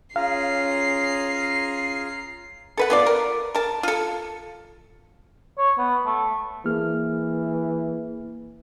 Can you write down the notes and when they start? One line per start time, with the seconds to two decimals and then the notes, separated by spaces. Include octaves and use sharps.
0.16 C#4 F4 G#4 F5 A#5 C7
2.77 A4 B4 F#5
2.90 B3 F4 D5
3.06 A#4
3.55 A#4 A5
3.83 F4 A4
5.58 C#5
5.78 B3
6.06 A3
6.66 E3 A#3 G#4 F6